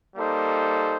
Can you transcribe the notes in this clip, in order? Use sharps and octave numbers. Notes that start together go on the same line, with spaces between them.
G3 A#3 D#4 A4 C5